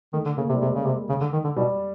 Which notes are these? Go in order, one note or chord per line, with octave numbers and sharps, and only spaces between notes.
D#3 A3
D3
C#3 A#3
C3
G3
C3 G#3
C#3
C3
C#3
D3
D#3
D3
B2 G3